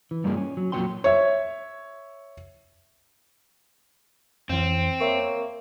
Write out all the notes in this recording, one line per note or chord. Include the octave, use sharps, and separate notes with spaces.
E3
G2 G3 A#3 F4 G#4 D5
C#4
F#3
F2 A#2 F#3 C#5 G5 C6
C#5 E5
F2 E3 C4
A#3 C#5 E5 C#6